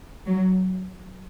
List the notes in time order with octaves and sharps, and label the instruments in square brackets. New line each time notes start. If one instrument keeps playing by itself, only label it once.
[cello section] F#3